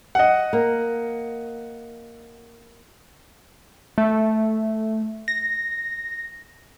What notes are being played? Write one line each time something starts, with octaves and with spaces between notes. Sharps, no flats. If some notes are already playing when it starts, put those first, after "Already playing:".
D#5 F#5
A#3
A3
A#6